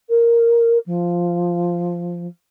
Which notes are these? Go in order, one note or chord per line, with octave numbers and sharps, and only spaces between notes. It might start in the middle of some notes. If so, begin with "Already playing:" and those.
A#4
F3